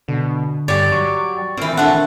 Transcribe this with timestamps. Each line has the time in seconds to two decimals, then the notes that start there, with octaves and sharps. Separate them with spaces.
0.08 B2 D3
0.68 G2 G4 C#5 D5
0.92 F#3 C#6
1.57 A#2 E3 C4
1.77 E3 A3 D4 F#5